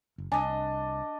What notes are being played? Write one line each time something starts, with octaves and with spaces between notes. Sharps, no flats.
F#1
C2 D4 D#5 G#5